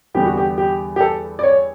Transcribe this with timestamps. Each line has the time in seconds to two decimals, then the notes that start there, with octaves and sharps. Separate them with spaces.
0.14 E2 D3 G3 B3 G4
0.26 F#4
0.37 G4
0.58 G4
0.96 G4
1.01 A4
1.39 D5
1.43 C#5